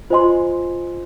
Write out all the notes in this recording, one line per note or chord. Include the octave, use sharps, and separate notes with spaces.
F4 C5 D#5 G#5 C6